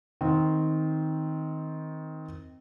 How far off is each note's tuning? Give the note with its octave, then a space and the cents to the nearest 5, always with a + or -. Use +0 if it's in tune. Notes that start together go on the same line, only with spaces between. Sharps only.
D#3 +15 C4 +0